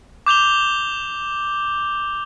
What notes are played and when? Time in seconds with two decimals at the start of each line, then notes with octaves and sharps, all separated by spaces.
0.26 D6 G6 F7 G7